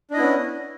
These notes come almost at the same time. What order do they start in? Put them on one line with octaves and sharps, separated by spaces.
D4 D#5 E4 B3 C#4